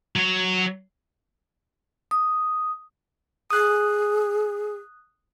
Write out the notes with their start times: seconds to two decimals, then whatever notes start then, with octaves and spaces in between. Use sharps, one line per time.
0.16 F#3 C#5
2.11 D#6
3.50 G#4 D#6 F#6